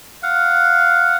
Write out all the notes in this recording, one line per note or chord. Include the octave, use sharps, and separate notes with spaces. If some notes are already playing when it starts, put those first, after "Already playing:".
F5 F#5